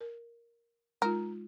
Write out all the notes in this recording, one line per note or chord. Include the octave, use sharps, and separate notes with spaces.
A#4
G#3 D#4 F4 A#4